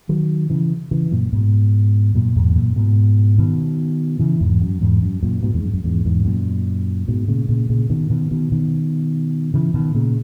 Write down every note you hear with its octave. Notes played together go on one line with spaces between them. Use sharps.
D#3 F#3
C#3 E3
C#3 E3
F#2 A#2
G#2 B2
F#2 A#2
E2 G#2
B2
F#2 A#2
G#2 B2
B2 D#3
C#3 E3
E2 G#2
F#2
E2 G#2
F#2
F#2 A#2
G#2 B2
E2 G#2
F#2
F#2
E2 G#2
E2 G#2
F#2 A#2
G#2 B2
A#2 C#3
A#2 C#3
A#2 C#3
B2 D#3
B2 D#3
B2 D#3
B2 D#3
C#3 E3
B2 D#3
A#2 C#3